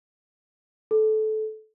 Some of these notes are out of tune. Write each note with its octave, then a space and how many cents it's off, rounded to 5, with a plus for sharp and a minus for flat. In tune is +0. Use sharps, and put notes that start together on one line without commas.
A4 -20